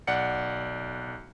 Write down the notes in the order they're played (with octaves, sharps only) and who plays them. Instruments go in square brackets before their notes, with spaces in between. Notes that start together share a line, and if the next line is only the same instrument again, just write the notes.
[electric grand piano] B1 D5 F#5 C#7